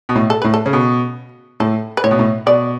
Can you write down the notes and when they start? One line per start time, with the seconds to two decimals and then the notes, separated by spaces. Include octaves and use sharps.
0.09 B2
0.15 A2
0.30 A4
0.42 A2 B4
0.54 A4
0.66 C#3
0.73 B2
1.60 A2 A4
1.97 B4
2.04 A2 C#5
2.11 B2
2.19 A2
2.46 B2 D5